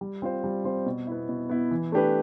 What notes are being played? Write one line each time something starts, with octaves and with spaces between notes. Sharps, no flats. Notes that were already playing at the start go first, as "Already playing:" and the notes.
G3
C4 F4 C5
G3
C4 F4 C5
B2
B3 E4
B2
B3 E4
E3
A3 D4 G4 B4